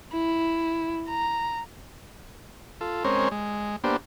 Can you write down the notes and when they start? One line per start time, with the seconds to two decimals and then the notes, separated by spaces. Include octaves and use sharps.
0.13 E4
1.09 A#5
2.81 F4 A4
3.04 G#3 C4 C#4 A#4 C5 C#5
3.31 G#3
3.84 A#3 B3 D4 G4 C5